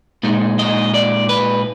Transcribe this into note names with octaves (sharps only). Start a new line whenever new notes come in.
A#2 G#3 D#4
D#5
D5
B4